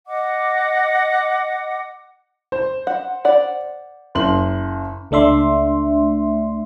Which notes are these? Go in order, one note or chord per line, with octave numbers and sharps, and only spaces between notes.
D#5 F#5 D6
C5
F#5
D5 F#5
F#1 C6 F#7
C#2 A3 D4 E5 C6